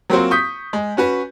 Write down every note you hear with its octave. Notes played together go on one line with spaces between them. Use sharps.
F#3 A#3 C4 F4 F#4 C5
C#6 D#6 G6 B6
G#3
C#4 F#4 B4